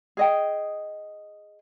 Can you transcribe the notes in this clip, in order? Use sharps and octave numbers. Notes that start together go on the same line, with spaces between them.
G#4 D#5 G5